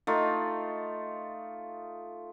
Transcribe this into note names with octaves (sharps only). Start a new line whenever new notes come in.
A3 D#4 F4